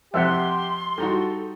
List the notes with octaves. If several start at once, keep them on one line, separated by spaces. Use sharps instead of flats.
F2 C3 G4 E5 F#5 C6
G3 D#4 F#4 A4